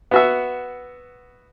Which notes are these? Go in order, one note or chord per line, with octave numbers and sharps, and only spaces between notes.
B3 F#4 E5